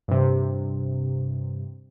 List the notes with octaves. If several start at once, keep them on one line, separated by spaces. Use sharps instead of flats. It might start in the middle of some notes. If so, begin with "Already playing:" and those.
G2 C3